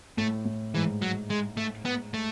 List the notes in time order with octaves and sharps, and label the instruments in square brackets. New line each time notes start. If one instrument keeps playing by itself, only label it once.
[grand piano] A2 [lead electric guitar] A3
[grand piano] A2
[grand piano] G#2 [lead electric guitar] E3
[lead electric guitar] F#3
G#3
A3
B3
A3